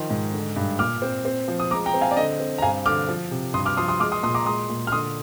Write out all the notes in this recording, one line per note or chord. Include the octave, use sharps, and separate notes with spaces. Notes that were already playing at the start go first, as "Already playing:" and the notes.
Already playing: D#3 F3 C6
G#2
D3
G2
A#2 D6 F6
C4
C4
F3
D#6
G#3 A#5 D6
G5 A#5
C4
F5 G#5
D5
D3 D#5
C4
A#5
G2 F5 G#5
D3 D6 F6
F3
C3
G2 C6 D#6
D6 F6
F3 C6 D#6
C6 D#6
G#3 D6 F6
C6 D#6
A#2 C6 D#6
A#5 D6
G#3 C6 D#6
A#2
F6
D3 C6 D#6